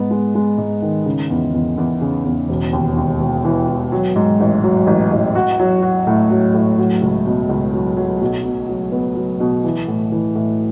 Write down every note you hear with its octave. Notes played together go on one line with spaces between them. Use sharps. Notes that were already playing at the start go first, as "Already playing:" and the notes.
Already playing: G#2 B3
G#3
G#3
G#2
D#3
C#3
E2
E2
E2
C#3
E2
E1
D#2
D#2
E1
E3
E3
F#3
G#2
A1
F#3
A1
A1
F#4
F#3
F#4
A2
F#3
A2
F#3
C#2
B2
C#2
F#3
F#3
B1
B2
F#3
B3
F#3
B2
E3
A2
E3
A2